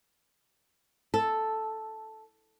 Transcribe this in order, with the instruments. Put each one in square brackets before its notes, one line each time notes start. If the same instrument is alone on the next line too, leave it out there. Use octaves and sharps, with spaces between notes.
[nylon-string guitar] A4